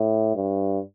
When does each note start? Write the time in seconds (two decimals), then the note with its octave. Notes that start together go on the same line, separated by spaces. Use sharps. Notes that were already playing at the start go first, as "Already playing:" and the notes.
Already playing: A2
0.35 G2